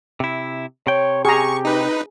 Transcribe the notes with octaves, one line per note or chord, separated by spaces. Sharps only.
C3 E4
C3 C#5 G5
G4 G#4 A#5 C#6
D#4 B4